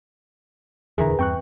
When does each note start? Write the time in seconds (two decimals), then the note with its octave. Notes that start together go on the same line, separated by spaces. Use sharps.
0.98 D#1 E2 D3 E3 G#4 A#4 A#5
1.19 E2 G2 C4 G5 C#6 F#6